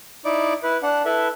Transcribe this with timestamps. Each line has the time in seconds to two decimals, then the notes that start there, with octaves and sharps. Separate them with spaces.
0.25 D#4 E4 D5
0.63 E4 B4
0.83 D4 F#5
1.05 E4 A4 B4 E5